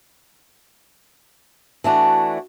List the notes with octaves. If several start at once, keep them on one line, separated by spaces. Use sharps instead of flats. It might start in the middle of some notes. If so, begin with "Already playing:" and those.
E3 A3 D4 F#4